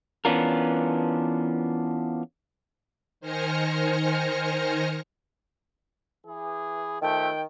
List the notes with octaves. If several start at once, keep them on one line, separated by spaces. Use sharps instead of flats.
E3 B3 C#4 D4 F4 A#4
D#3 C5 G#5 F6 A#6 C#7
E3 G#4
D#3 F3 A3 G5